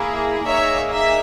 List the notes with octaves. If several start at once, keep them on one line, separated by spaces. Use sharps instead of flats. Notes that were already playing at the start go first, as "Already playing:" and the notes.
Already playing: A#3 E4 G#4
A#3 D#4 G#4 C#5 E5
E5